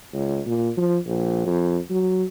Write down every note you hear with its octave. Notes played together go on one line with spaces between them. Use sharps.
C#2
A#2
F3
A#1
F2
F#3